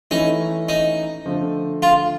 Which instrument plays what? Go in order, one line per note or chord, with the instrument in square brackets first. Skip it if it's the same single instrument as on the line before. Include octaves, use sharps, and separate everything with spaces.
[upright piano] E3 A3 C#4 E4 [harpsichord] D#4
[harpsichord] D#4
[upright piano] D3 F3 A3
[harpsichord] F4